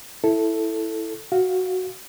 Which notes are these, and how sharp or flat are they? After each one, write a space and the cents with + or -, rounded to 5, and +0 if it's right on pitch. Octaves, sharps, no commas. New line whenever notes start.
E4 +0 A4 +0
F#4 +0 F5 +0